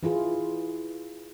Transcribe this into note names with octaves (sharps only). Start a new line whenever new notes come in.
E3 E4 F4 G#4